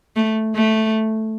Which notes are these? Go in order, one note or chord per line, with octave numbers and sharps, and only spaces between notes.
A3
A3